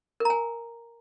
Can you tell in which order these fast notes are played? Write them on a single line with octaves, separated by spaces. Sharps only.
A#4 A#5 G#5